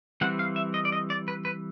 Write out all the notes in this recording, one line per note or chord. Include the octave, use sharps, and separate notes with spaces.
E3 G3 C4 F#5
F5
E5
D#5
D5
D#5
D5
B4
B4